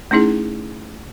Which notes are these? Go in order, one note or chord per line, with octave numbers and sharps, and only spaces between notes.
A3 C#4 D#4 E4 G#4